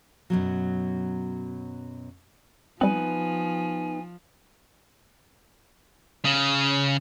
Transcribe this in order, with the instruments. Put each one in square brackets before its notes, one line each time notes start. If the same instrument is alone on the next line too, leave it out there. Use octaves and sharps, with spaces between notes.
[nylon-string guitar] F#2 B2 F#3
[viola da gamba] F3 [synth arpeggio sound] G3 C4 [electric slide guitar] B3 D#4 B4 [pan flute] G#5
[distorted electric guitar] C#3